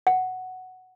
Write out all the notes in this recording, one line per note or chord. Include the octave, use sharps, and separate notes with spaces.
F#5